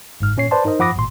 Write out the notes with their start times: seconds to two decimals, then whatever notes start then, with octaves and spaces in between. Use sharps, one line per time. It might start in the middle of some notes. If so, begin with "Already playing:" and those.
0.20 G1 G#2 F6
0.37 A#2 C#4 C#5 C7
0.51 B4 C5 D5 A5 C6
0.65 D#4 A#4 C5 D#5
0.80 F3 F#5 B5 D6 D#6 A#6
0.96 G#1 A#2 C6